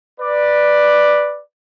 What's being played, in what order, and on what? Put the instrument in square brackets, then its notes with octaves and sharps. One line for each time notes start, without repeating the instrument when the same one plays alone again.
[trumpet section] B4 D5